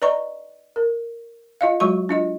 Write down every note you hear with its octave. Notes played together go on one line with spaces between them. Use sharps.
B4 D5 D#5 A#5 C#6
A#4
F4 D#5 F5
F#3 G#3 F#4 C#6
D4 F4 D#5